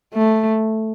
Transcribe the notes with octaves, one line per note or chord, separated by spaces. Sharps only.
A3